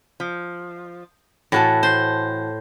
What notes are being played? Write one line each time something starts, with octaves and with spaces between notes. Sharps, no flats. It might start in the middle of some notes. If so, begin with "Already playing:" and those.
F3
A2 E3 F#4 A4
C5